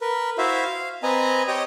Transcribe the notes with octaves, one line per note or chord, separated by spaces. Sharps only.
A#4 B4
E4 F#4 C5 E5 F5
F5
C4 B4 D#5 G#5 A#5
G4 C#5 D#5 G5 D#6